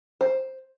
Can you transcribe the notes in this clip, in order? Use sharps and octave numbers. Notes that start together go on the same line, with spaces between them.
C5